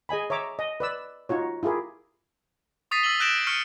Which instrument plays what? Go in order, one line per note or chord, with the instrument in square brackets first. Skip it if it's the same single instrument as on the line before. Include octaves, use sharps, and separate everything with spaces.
[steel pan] G#4 D#5 G#5 B5
C#5 E5 A#5 D6
D#5
B4 D5 E6
D#4 F4 F#4 C#5
E4 F4 G4 G#4 A#4
[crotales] C#6 D#6 A6 B6 C7 D#7
D#6 E6 A6 F#7 G7
E6 F#6 G6 A#6 D7 E7
C#6 F6 C#7 D#7